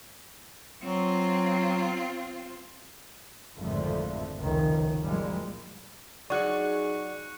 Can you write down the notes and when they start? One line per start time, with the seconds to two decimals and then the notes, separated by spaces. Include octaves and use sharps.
0.83 F#3 C4 F4
3.58 G#1 F2 A2 D3 F3 A3
4.38 F1 C#2 D#3 C#4
5.02 F#2 A#2 F3 G3 G#3
6.30 F#3 D#4 F#4 G#4 D5 C#6 F#6 C#7